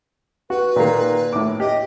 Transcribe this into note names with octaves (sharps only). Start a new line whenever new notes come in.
F#4 B4
A#2 D#3 A#3
A2 D6
G4 D#5